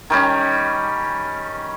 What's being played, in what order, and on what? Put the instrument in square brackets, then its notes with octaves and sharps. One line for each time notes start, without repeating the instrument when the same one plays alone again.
[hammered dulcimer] D#3 G3 C#4